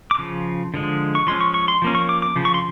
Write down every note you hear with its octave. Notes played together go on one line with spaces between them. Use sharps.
D6
C#3 F3
D3 F3 G#3
C#6
F3 G#3 C#4 C6
C#6
C#6
C6
F3 A#3 C#4
C#6
D6
D6
C#3 F3
C#6
C6